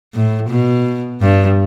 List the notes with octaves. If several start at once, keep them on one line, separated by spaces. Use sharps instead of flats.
A2
B2
G2